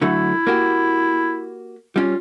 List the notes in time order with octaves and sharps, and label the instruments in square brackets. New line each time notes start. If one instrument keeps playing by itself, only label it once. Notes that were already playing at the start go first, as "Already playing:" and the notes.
[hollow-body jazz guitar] D3 F#3 A3 [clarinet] E4
[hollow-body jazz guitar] A#3 F#4 G4
[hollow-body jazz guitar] G3 C#4 [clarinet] F4